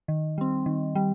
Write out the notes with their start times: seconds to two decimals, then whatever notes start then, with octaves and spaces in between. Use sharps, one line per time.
0.08 D#3
0.38 G3 C4
0.66 D#3
0.95 G3